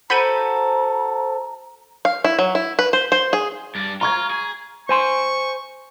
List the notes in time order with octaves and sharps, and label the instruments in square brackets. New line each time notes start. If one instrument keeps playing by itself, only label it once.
[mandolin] F#4 A4 [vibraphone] C5 [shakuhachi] A#5 [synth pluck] B5 G6 D#7
[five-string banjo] F5
E4
F#3
E4
B4
C5
C5
G#4
[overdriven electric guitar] G2 D4
[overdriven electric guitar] F4 [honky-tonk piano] A#5 C#6 G#6
[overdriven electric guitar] G#4
[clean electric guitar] C5 G#5 C6 [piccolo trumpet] C#6